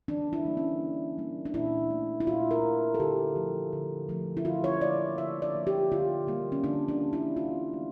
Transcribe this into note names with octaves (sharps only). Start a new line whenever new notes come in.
E3 D4
E4
G3 A#3
C#4
E3
G3 A#3
D4
A#2 E4
A3
E4
A#2 F4
A#4
A3
A4
D3 G4
F3 A3
D3
F3 A3
E4
D3 F4
C#5
F3 A#3 D5
D3 E5
D5
F3 A#3
G4
D3 F4
G3 A#3
C#4
D3 D4
D4
G3 A#3
E4
E3 F4
A3